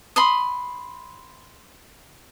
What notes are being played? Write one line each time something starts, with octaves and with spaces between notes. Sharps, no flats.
B5 C6 D#6